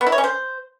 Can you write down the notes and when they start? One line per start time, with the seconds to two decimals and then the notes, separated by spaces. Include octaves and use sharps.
0.01 B3
0.07 E4
0.12 C#5
0.18 C#4
0.24 C5